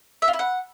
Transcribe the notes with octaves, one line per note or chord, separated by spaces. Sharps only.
E5
F4
E4
F#5